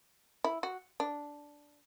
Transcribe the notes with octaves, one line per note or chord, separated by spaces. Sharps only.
E4
F#4
D4